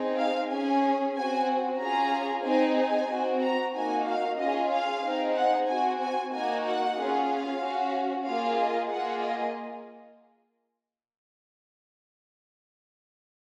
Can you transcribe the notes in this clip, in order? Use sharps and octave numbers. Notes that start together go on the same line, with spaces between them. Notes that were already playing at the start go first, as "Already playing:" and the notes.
Already playing: C4 D#4 G#4
F5
C#4 G#4 G#5
C4 F#4 G#5
C#4 F4 G#4 A#5
C4 D#4 G#4 G#5
G#5
C4 F#4
A#5
A#3 D#4 F#4 G#5
F5
C#4 F4 G#4 D#5
F5
C4 D#4 G#4
F#5
C4 F#4 G#5
G#5
A#3 D#4 F#4 G#5
F#5
C#4 F4 G#4
F5
C#4 F#4
A#3 F4 G#4 F5
D#5
A#3 F4 G#4 F#5
D#5